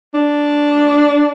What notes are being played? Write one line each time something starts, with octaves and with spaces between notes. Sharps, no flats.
D4